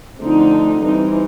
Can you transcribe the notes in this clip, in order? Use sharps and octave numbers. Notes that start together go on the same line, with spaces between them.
D3 F3 A3 C4 D#4
E3 G3 C4 D#4